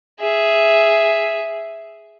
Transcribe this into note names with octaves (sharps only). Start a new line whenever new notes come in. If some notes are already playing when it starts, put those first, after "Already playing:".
G#4 E5